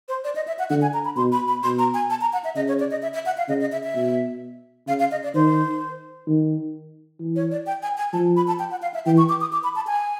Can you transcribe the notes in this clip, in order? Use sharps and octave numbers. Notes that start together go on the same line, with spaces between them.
C5
D5
D#5
E5
F#5
D3 F#5
G#5
A#5
B5
B2 C6
B5
B5
B2 C6
A#5
G#5
A5
A#5
F#5
E5
C#3 D#5
C#5
D5
D#5
E5
E5
F#5
F5
C#3 D#5
D#5
E5
E5
B2
C#3 F5
F5
D#5
D5
D#3 C5
D#3
E3
C#5
D5
G5
G#5
G#5
F3 A5
B5
A5
G5
F#5
F5
E5
E3 G5
C#6
D6
D#6
D6
B5
A5
G#5